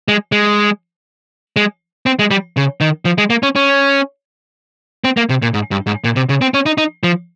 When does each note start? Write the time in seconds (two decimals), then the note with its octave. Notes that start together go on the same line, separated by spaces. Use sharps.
0.08 G#3
0.32 G#3
1.56 G#3
2.06 C4
2.19 G#3
2.31 G3
2.57 C#3
2.81 D#3
3.05 F3
3.18 G#3
3.30 A#3
3.43 C#4
3.56 C#4
5.04 C4
5.17 A#3
5.29 C3
5.42 A#2
5.54 G#2
5.71 G2
5.87 G#2
6.04 A#2
6.16 C3
6.29 C#3
6.41 C4
6.54 C#4
6.66 D#4
6.78 D#4
7.03 F3